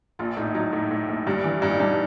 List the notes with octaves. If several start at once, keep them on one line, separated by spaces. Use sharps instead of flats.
A#1 F4
A2 D#4
F#3 D#4
A2
A2
A#1
G2
E3
G2
D#4
G2 D4